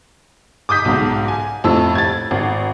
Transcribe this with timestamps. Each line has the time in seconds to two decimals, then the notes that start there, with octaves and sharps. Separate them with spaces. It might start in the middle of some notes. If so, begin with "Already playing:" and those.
0.69 D6 D#6 G6 B6
0.85 B1 G#2
1.28 G#5
1.64 F2 A2 E6
1.95 G#6 A6
2.31 G#1